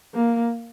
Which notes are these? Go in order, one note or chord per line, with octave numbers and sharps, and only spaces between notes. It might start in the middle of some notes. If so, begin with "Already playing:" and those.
A#3